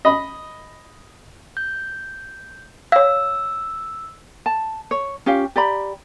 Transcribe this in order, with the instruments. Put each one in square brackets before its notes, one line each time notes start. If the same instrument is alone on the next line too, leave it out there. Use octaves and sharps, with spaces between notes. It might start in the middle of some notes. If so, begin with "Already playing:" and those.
[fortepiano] D#5 B5
[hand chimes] G6
[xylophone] C#5 F5 [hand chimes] E6
[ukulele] A5
C#5
C#4 F4 G4 F5
G4 D5 A#5 B5